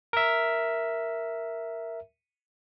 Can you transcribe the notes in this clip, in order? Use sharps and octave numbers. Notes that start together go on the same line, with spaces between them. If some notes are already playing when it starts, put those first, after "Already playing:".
A#4 E5